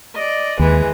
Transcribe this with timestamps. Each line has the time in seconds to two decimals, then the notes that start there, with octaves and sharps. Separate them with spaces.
0.14 D5 D#5
0.59 D#2 E3 G#3